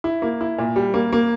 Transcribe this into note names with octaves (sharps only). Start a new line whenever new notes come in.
E4
A#3
E4
A#2
G3
A#3
A#3